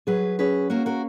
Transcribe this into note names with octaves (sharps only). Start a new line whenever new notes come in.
F#3 G#4 B4
C#4 G#4 B4
A#3 F#4 A#4
F#4 A#4